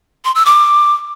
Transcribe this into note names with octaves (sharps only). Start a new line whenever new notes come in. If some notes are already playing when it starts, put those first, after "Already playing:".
C6
E6
D6